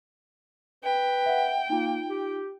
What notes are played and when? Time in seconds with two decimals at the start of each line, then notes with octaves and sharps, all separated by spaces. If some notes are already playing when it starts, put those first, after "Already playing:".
0.84 B4 G5
1.26 E5 F#5
1.70 A#3 D#4 F4
2.10 G4